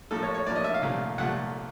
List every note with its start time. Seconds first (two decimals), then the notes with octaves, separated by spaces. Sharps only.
0.11 A2 F3 A#3 A4
0.23 C#5
0.34 C#5
0.47 A2 F3 A#3 D5
0.56 D#5
0.64 E5
0.74 F5
0.82 C2 A#2 F3 A3
1.18 C2 A#2 F3 A3 F#5